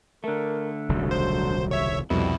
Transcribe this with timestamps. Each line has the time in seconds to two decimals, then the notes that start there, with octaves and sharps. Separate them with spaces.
0.24 D3 A3 A#4
0.89 D#1 C2 C#3 F#3
1.11 C5
1.71 C#5 E5
2.10 C2 F2 B2 G3 E4